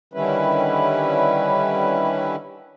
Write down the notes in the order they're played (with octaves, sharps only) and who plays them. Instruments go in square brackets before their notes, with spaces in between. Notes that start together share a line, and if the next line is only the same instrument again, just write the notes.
[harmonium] D3 D#3 G3 C#4 E4 B4